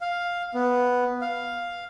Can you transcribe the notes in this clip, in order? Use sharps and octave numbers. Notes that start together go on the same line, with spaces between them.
F5
B3
F5